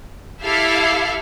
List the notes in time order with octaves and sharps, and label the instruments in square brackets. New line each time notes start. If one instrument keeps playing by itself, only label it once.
[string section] E4 G4 A4 E5 F5